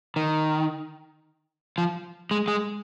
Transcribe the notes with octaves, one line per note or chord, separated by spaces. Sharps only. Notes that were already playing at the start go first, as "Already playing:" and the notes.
D#3
F3
G#3
G#3